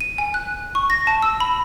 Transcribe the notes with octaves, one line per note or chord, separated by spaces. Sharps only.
D#7
G#5
F#6
C#6
A#6
A5
E6
B5